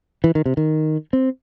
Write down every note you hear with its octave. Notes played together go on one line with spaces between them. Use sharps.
E3
D#3
C3
D#3
C4